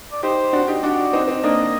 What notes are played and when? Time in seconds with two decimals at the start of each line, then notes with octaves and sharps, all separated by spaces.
0.12 D5
0.23 D#4 G4 C5
0.53 D4 F#4
0.68 D#4 G4
0.83 D4 F#4 D5
1.13 C4 D#4
1.28 C4 D#4
1.43 A#3 D4 D#5